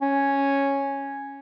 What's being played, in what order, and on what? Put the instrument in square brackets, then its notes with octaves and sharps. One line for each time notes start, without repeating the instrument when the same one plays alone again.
[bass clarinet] C#4